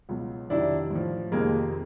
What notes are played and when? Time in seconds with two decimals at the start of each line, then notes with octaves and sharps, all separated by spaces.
0.09 C#2 B2 F#3
0.50 F2 C3 D#3 F#3 D4 E4
0.90 A2 F3
1.32 F2 C3 D#3 G#3 A#3